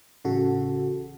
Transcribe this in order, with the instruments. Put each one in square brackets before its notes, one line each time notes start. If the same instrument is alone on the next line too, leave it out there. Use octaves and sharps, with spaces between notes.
[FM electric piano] A1 C#3 F#4 A4